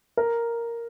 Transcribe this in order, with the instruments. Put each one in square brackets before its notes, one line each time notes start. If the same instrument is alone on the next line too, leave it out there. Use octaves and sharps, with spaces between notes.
[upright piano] A#4